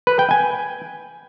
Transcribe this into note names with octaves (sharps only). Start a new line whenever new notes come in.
B4
G5
G#5